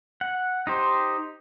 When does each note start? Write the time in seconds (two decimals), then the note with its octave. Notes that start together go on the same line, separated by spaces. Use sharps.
0.21 F#5
0.67 D#4 G4 C5